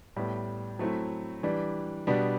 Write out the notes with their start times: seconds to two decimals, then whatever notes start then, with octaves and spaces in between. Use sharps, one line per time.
0.16 A2 G3 B3
0.79 F#3 A3 C4 E4
1.43 E3 G3 D4
2.07 B2 G3 B3 D4